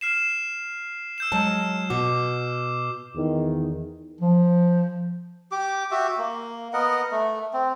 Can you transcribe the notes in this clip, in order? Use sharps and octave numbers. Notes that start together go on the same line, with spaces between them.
F6 C7 E7
E6 G6 E7
F#3 G#3 A5
B2 F#4 D6
E2 D#3
F3
G4 D6
F#4 G4 E5
A#3
B3 A#4 D#5 F#5
A3
C4